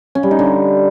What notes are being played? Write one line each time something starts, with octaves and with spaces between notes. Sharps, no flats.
C#4
G3
D#4
D3